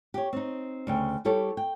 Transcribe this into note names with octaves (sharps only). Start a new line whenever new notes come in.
G4 C#5
C4 D#4
D2 C#3 G5
G3 E4 G4 A4 C#5
G5